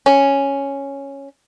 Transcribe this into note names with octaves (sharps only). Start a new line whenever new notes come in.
C#4